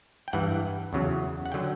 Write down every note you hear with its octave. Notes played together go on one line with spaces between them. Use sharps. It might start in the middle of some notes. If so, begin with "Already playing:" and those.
G5
G2 E3 F#5
E2 C#3 F#3
F#5
D3 F#3 G5